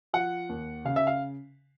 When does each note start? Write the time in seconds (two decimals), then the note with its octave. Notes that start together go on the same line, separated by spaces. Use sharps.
0.13 F3 F#5
0.49 D#2
0.85 C#3 F5
0.96 E5
1.07 F5